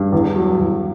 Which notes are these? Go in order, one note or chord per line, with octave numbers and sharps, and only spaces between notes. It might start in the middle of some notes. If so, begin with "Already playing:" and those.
Already playing: G2
E2
F#3
E2